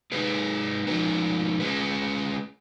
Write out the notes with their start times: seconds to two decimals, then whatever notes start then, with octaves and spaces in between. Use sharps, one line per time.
0.12 G#3 D#4 G#4 B4
0.87 F3 G#3 D#4 A#4
1.60 G#3 C#4 G#4 B4